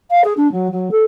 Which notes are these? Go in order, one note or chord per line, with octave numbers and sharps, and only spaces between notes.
F5
G#4
D4
F#3
F#3
A4